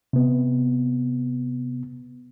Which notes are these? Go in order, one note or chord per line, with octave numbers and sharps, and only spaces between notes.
C3 B3